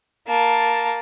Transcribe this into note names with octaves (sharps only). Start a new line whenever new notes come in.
A#3 A5